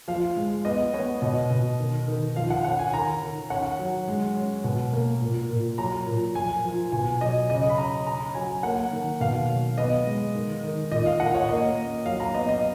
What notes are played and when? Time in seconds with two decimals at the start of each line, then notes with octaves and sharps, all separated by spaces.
0.08 F3 F5
0.36 G#3
0.65 B3 D#5
0.93 B3 C#5
1.22 B2 D#5
1.50 B2
1.79 D#3
2.08 D#3
2.36 F3 F5
2.50 F#5
2.64 C#4 F#5
2.79 G#5
2.93 D#3 A#5
3.22 D#3
3.50 C#4 F#5
3.79 F#3
4.07 G#3
4.36 C#4
4.64 B2
4.93 A#3
5.21 A#2
5.50 A#2
5.78 F#3 A#5
6.07 A#2
6.35 F3 G#5
6.64 F3
6.92 B2 G#5
7.21 F#3 D#5
7.49 C#3 D#5
7.69 B5
7.78 C#4 A#5
8.07 C#4 A#5
8.35 F#3 G#5
8.63 A#3 F#5
8.92 D#3
9.20 B2 F5
9.49 F#3
9.78 B3 D#5
10.06 G#3
10.35 D#3
10.63 D#3
10.91 A#2 D#5
11.06 F5
11.20 A#2 F#5
11.35 C#5
11.49 A#3 D#5
11.77 C#4
12.06 F#3 F5
12.20 A#5
12.34 B3 D#5
12.49 D#5